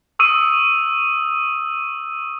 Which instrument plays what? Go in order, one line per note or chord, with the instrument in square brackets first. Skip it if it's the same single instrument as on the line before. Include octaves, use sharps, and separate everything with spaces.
[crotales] C#6 D#6 E6 D#7